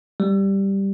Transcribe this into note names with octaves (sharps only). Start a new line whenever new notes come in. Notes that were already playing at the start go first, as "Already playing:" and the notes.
G3